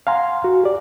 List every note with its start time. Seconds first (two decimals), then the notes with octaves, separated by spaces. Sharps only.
0.07 F5 F#5 G#5 A#5 C6
0.44 F#4
0.64 G4 D5